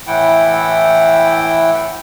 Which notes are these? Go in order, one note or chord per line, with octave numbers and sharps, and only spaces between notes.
A2 E3 E4 F#5 G5